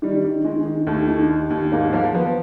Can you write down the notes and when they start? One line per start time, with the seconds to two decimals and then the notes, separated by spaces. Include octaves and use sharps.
0.02 D#3 G3
0.24 D#3
0.44 D#3 G#3
0.66 D#3
0.87 D#2 A3
1.08 D#3
1.29 D#2
1.51 D#2
1.72 G#2 A#3
1.93 F3 A#3
2.14 F3 B3